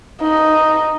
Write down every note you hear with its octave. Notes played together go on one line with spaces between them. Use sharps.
D#4